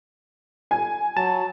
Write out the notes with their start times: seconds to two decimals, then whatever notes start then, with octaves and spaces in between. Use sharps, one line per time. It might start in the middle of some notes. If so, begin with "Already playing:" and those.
0.71 G#5
1.17 F#3 A5